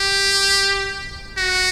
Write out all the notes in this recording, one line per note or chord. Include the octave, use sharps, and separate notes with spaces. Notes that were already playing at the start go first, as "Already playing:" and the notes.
Already playing: G4
F#4